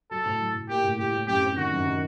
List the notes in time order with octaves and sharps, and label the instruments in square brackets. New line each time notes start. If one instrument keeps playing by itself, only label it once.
[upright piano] F#3 [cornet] A4
[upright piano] A2
F#3
A2
[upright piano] A#3 [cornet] G4
[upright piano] A2
[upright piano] A2 [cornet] G4
[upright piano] A2
[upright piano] F#2 [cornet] G4
[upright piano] C4
[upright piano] D#3 [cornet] F#4
[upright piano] F#2
D#3